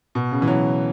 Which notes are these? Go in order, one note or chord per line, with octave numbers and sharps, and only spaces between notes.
B2
C#3
E3
F#3